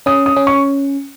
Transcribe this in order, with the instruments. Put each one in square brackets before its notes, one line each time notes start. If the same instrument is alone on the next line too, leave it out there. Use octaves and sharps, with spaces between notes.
[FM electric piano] C#4 [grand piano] D#6
[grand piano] D#6
[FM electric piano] C#4
[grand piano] C#6